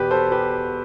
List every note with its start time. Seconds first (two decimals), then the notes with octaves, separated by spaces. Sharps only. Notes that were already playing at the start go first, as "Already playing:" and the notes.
Already playing: E2 B2 G4 B4
0.11 A4 C5
0.32 G4 B4